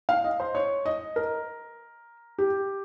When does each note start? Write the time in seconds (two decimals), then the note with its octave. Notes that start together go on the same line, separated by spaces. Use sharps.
0.09 F5
0.24 D#5
0.40 C5
0.55 C#5
0.86 D#5
1.16 A#4
2.38 G4